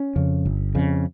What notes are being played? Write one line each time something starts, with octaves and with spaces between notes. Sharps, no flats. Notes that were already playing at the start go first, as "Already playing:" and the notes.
Already playing: C#4
F2 C#3
G1
F2 C#3